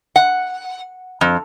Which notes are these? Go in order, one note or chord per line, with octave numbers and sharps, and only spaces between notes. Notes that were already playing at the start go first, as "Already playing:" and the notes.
F#5
F2